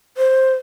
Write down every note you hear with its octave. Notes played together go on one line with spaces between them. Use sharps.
C5